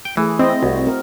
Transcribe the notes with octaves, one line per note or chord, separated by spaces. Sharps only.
G5
E3 A3 G#4
C4 E4 D#5
C2 F#4
C4 A#4